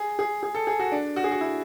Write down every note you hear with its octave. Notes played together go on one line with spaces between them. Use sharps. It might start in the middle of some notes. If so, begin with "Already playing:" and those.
Already playing: G#4
G#4
G#4
A4
G#4
F#4
D4
F#4
G#4
F#4
E4